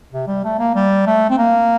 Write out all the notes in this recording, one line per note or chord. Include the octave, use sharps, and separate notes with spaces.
C3
G3
A3
A#3
G3
A3
C4
A#3